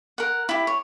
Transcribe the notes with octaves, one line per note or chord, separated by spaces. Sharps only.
A#4 F#5
E4 G4
C#5